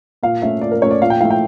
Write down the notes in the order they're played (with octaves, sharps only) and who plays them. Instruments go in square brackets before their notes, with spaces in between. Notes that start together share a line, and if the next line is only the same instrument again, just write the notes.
[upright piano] A#2 F5
A3 C#4 E5
A#2 D5
A#4
A3 C#4 C#5
D5
A#2 F5
G5
A3 E4 F5
G5